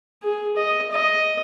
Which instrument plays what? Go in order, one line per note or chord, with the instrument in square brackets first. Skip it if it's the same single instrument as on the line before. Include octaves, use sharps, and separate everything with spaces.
[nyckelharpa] G#4
D#5
D#5